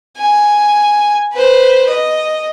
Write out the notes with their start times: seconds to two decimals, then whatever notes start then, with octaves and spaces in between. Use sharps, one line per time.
0.18 G#5
1.33 B4 C5
1.90 D#5